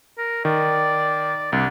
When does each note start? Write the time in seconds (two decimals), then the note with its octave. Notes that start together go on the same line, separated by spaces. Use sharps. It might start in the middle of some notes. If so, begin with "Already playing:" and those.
0.18 A#4
0.45 D#3 D5
1.52 C2 D4